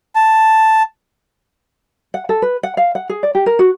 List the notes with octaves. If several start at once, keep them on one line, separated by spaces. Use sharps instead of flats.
A5
F#5
A4
B4
F#5
F5
F#5
G#4
D5
G4
A#4
F#4